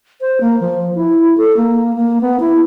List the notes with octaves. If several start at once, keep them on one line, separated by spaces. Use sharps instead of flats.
C5
A#3
F3
E4
A4
A#3
A#3
B3
E4